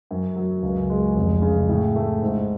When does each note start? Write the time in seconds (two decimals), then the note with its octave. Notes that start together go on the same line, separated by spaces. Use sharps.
0.11 F#2
0.36 F#3
0.63 C#2
0.90 G#3
1.16 F1
1.42 C#3
1.69 A2
1.96 A3
2.22 G#2